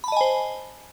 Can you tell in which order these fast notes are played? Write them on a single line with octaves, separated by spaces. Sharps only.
B5 A5 D#5 G#5 C5